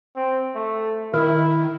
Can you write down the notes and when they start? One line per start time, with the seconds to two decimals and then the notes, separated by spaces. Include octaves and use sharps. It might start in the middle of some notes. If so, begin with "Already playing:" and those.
0.16 C4
0.55 A3
1.14 D#3 E4 A#4 F6